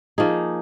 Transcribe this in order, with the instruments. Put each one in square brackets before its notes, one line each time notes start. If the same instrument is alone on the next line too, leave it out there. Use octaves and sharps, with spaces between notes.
[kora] F3 A#3 D#4 G#4